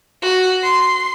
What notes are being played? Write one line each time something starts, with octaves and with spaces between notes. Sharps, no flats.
F#4
C6